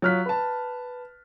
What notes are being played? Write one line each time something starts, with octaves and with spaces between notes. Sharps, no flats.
F#3 F4 F6 F#6 B6
B4 A5